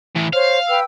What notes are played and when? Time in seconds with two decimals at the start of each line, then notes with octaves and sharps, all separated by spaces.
0.16 A2 E3
0.33 C5 C#5 F5
0.68 B4 G5 E6